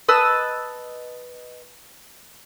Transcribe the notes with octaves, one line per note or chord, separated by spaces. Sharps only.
B4 D#5 A5 E6